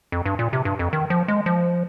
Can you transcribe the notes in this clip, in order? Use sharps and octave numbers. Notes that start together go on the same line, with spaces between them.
F2
G2
A#2
C3
G2
F2
D#3
F3
G#3
F3